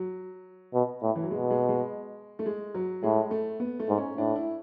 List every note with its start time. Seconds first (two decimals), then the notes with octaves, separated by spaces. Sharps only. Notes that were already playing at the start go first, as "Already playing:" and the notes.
Already playing: F#3
0.74 B2
1.03 A2
1.15 E3
1.23 F#3
1.31 B2 G#3
1.51 G#3
1.69 G#3
2.39 A3
2.46 G#3
2.74 F#3
3.03 A2 G#3
3.31 A3
3.60 B3
3.79 A3
3.89 G#2
3.98 C#4
4.17 A2 D4
4.36 E4